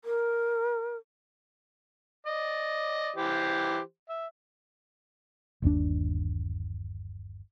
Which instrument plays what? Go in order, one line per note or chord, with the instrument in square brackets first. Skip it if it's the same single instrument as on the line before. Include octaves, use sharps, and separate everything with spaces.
[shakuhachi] A#4
[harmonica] D5 D#5
E3 G4 C5
E5
[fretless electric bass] G1 D#2 C#3 D4